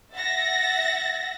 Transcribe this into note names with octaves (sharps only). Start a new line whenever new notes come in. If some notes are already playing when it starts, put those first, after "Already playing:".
E5 F#5 A6 A#6